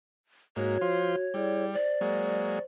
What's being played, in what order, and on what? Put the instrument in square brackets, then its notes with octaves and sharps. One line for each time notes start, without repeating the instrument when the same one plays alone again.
[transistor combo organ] G#2 A#3 [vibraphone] F#4 [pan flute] C#5
[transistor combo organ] F3 F4 C5
[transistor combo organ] G3 [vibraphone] E4 G#4 D5
[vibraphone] C5 [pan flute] D5
[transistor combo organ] F#3 G#3 A#3